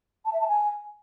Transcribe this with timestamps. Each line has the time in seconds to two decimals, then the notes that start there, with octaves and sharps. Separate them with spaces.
0.25 A5
0.33 E5
0.40 A5
0.48 G#5